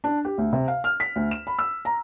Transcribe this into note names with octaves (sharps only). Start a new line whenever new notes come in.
D4
G4
D2
C3
F5
F6
B6
D2
E7
B5
E6
A#5